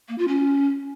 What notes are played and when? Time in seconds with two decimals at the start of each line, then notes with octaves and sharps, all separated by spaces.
0.09 A#3
0.18 F4
0.28 C#4